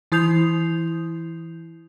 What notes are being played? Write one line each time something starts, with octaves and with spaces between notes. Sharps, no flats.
E3 E4 D#6 G6 C7 F7